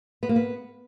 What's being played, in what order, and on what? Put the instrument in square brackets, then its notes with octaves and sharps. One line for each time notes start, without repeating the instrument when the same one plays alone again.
[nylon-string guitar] B3
A#3
B3